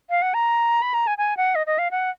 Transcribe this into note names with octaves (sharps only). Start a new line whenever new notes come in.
F5
F#5
A#5
B5
A#5
G#5
G#5
F#5
D#5
D#5
F5
F#5